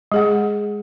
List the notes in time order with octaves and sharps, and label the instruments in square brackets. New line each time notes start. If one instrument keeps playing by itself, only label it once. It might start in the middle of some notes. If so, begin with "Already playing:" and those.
[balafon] G#3 G#4 F#5